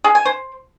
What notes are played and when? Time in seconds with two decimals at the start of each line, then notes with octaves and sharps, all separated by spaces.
0.04 G#4
0.15 G#5
0.25 C5